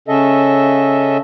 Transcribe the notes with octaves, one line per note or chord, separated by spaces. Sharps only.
C#3 C#4 A4 D#5 E5